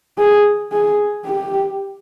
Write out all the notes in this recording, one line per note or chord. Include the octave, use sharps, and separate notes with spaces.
G#4
G#4
G4